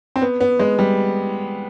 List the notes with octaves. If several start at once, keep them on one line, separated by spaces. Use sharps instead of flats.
C4
B3
B3
G#3
G3